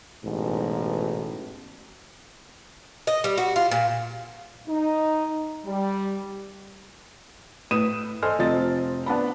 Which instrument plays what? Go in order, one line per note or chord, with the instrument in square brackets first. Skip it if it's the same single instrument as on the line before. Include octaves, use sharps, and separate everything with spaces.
[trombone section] A1 G#2 B2
[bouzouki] D#5
G3
F#4
F4
A#2
[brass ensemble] D#4
G3
[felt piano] A2 B4 D#6 D#7 E7
A4 C5 D#5 G#5 C6 F6
F1 F3 C4 D#5 A6
B3 D4 A5 B5